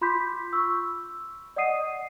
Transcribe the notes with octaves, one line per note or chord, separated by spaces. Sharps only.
F4 B5 C6 D6 G6 B6
C#6 E6
D5 D#5 F#5 D#6 C7 D#7